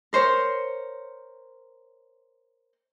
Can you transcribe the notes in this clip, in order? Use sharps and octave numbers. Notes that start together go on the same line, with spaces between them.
A#4 C5 C#5